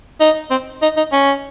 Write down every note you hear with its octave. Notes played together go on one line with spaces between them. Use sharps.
D#4
C4
D#4
D#4
C#4